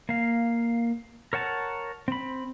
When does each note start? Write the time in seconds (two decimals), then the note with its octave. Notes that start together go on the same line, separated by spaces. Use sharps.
0.09 A#3 F5
1.33 A#4 C#5 F#5 A5 A#5
2.08 C4 B5